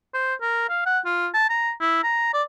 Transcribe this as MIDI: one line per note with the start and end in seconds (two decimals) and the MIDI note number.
0.14 0.34 72
0.41 0.68 70
0.69 0.85 77
0.86 0.99 78
1.05 1.28 65
1.34 1.50 81
1.50 1.72 82
1.81 2.00 64
2.03 2.33 82
2.34 2.42 74